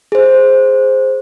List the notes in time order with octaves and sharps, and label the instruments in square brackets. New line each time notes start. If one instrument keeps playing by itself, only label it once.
[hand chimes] G#4 C5